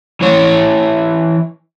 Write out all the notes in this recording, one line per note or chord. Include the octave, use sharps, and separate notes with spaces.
E3 C#5